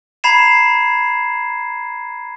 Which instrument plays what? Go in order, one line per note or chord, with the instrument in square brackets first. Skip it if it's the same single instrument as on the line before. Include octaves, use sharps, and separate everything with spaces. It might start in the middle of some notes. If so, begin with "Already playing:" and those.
[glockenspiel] A#5 B5 G#6 C7 E7